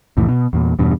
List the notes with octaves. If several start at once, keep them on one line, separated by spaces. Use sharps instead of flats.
C2 F2 A2 E3
B2
E2 A#2
E2 G2 B2